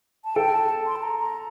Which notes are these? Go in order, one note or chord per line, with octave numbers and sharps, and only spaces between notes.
A5
A4 G5
A5
C6
A5
A#5
A#5